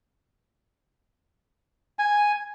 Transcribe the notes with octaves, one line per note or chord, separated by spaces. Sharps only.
G#5